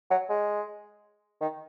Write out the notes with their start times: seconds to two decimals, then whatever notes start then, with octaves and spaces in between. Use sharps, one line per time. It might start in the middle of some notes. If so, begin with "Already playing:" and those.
0.11 F#3
0.29 G#3
1.41 D#3